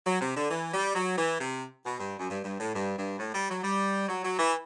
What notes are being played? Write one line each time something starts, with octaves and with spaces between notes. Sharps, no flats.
F#3
C3
D3
E3
G3
F#3
E3
C3
B2
G2
F#2
G2
G2
A2
G2
G2
A2
G3
F#3
G3
F#3
F#3
E3